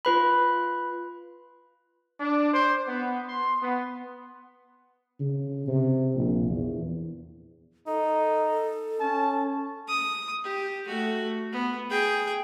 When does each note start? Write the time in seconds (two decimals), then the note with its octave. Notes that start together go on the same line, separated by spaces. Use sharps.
0.05 F4 B4 B5
2.20 D4
2.54 C5
2.87 B3
3.28 C6
3.62 B3
5.20 C#3
5.67 C3
6.15 A#1
6.50 E2
7.87 D#4 A4
9.00 C#4 A5
9.88 D#6
10.44 G4
10.86 A3 F#4
11.52 B3
11.89 G#4 G5